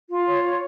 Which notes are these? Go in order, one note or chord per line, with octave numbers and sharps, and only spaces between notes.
F4
C#5
C#5